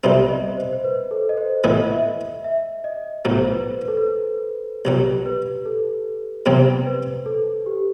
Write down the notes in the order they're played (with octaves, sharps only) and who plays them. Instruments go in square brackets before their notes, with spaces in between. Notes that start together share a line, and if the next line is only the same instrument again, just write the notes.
[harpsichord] B1 B2 G3 C4 D#4 [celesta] E5
[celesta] D#5
C5
C5
B4
A4
D#5
C5
[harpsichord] A2 E3 B3 E4 [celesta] D#5
[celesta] D#5
E5
E5
D#5
[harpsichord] B1 A2 F#3 [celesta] C5
[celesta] B4
B4
A4
B4
[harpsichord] B1 B2 F#3 [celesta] G4
[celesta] B4
A4
[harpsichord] E2 C3 F#3 C4 [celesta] C5
[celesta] B4
A4
G4